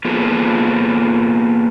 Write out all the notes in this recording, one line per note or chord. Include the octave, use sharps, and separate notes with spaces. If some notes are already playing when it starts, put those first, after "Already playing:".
A#3 B3 F4 G#4 A4